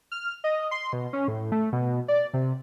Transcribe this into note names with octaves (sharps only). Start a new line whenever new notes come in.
F6
D#5
C6
B2
C#4
A2
A3
B2
D5
C3